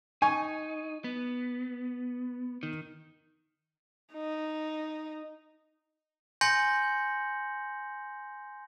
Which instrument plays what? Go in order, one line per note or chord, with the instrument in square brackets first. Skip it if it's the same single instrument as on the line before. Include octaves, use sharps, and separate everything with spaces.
[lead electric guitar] D#4 [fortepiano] G#5 C#6
[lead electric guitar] B3
D#3
[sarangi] D#4
[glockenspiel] G#5 C6 G6 A#6 C#7 F#7